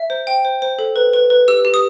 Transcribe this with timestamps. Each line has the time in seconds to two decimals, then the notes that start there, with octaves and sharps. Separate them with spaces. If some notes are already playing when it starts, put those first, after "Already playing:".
Already playing: E5
0.10 C5
0.27 G5
0.45 C5
0.62 C5
0.79 A4
0.96 B4
1.13 B4
1.30 B4
1.48 G4 E6
1.65 G4
1.74 D#6